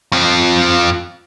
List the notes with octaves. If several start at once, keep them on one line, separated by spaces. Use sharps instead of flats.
F2 F3